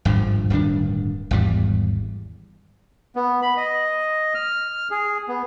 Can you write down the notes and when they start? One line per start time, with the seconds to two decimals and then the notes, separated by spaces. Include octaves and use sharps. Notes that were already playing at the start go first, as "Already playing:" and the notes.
0.05 G#1 G2 A#2 F3
0.50 D1 G2 D#3 D4
1.31 G#1 E2 G3
3.16 B3
3.42 B5
3.57 D#5
4.34 F6
4.91 G#4
5.28 B3